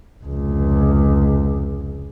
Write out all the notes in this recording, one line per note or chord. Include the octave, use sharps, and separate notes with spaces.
F1 C#2